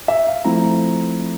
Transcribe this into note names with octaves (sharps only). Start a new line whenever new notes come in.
E5
F5
F3 A3 C4 E4 A#5